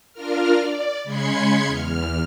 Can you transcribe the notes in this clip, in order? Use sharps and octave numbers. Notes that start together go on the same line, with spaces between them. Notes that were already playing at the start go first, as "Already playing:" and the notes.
D4 F4 A#4 F6
D5
C#3 G#3 B5 C6 G#6 C#7
E2 F6